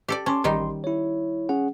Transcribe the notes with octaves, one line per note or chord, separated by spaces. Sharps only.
G4 A4 D5
C#4 A5 C6 D6
A1 D#3 G3 D#4 C6
E4 C#5
C#4 G#4 F#5